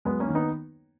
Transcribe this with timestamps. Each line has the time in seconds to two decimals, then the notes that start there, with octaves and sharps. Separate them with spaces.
0.05 F#2 G#3 B3
0.20 A#3 C#4
0.28 D#3
0.35 B3 D#4